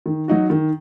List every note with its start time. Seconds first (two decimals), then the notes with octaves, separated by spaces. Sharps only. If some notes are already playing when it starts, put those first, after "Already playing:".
0.06 D#3
0.28 F#3 D#4 F#4
0.50 D#3